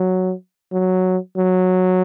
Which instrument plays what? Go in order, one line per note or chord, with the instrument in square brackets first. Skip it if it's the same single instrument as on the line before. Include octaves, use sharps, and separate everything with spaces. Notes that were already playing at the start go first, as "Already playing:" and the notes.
Already playing: [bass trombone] F#3
F#3
F#3